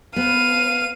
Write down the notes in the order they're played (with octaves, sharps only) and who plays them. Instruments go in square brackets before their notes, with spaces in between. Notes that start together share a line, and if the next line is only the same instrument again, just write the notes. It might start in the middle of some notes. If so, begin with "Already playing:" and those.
[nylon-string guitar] B3 [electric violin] F5 [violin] D#7